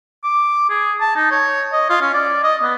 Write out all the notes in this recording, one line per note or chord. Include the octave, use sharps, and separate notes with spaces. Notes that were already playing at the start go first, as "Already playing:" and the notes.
D6
G#4
A5
D#4
C#5
D#5
F4
C#4
D5
D#5
B3